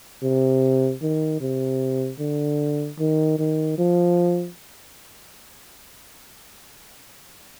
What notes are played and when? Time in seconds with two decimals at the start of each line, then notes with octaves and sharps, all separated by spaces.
0.23 C3
1.02 D#3
1.41 C3
2.19 D3
2.99 D#3
3.39 D#3
3.78 F3